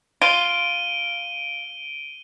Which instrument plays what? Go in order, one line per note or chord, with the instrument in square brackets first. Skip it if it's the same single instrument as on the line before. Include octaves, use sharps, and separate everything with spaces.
[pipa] F4 [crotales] D7 D#7 G7